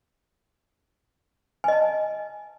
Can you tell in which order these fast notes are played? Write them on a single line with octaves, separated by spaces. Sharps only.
G#5 D#5 A5